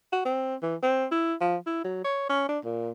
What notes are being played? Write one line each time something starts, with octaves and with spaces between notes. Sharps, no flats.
F#4
C4
E3
C4
E4
F3
E4
F#3
C#5
C#4
D4
A#2